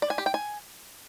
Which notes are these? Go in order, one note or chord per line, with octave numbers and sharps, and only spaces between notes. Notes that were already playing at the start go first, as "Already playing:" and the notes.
D5
G#5
G4
G5
G#5